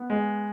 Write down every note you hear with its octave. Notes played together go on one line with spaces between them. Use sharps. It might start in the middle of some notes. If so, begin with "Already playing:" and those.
Already playing: B3
G#3